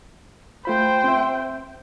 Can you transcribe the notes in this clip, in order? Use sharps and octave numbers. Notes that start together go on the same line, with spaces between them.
A3 F4 C5 G5 B5
C4 E5